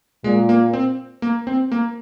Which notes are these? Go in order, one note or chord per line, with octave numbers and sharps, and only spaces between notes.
A#2 G#3
A#3
C4
A#3
C4
A#3